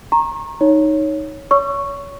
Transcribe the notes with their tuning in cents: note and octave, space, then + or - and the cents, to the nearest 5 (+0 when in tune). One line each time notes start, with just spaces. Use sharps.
A#5 +0 C#6 -35
D#4 +0 C#5 +0
C#5 +30 C#6 +0 E6 +40